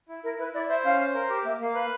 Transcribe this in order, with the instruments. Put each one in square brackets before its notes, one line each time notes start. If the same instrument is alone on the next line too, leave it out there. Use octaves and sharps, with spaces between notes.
[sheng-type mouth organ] E4
[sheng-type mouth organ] E4 [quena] A#4
[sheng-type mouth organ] E4 [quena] B4
[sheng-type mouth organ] E4 [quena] D5
[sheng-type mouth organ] C5 [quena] E5
[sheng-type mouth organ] C#4 [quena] F5
[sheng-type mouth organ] C5
A#4
G4
[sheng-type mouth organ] A#3 [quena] E5
[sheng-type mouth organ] A#3 [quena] F5
[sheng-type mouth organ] B4